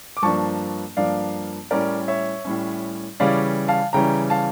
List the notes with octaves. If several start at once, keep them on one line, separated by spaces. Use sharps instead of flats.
D6
G2 F3 A#3 D4 A5 C#6
G2 F3 A#3 D4 D5 F5
A2 G3 C#4 A#4 D5
C#5 E5
A2 G3 C#4
C#3 E3 G3 C#4 D5 F5
F5 A5
C#3 E3 G3 C#4 G5 A#5
F5 A5